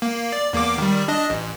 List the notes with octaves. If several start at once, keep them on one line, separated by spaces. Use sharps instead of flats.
A#3
D5
E2 A#3 D6
D#3 G3
D4 D#5
A1